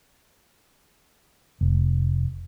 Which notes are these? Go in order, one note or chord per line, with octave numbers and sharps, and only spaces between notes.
F1